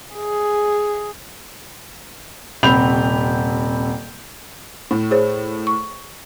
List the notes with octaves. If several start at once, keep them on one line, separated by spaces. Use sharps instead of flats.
G#4
D#1 C3 C4 B5 G6 F7
A2
G#4 C5 C#5
C#6